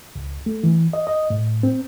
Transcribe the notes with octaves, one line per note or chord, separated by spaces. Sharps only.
C#2
A3
E3
D#5
D#5
A2
C4